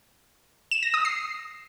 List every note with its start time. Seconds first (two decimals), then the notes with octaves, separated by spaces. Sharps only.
0.71 E7
0.83 A#6
0.94 D#6
1.05 C7